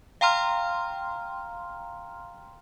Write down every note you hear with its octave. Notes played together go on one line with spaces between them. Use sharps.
F5 G5 A#5 C6 F6